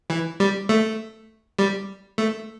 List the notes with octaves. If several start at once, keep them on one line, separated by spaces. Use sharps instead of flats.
E3
G3
A3
G3
A3